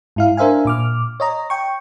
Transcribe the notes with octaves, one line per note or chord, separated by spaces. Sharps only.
G#2 E4 F5
D4 A#4 C5 E5 F5 G#5
A#2 D6 F6
C#5 D#5 A#5
G5 C#6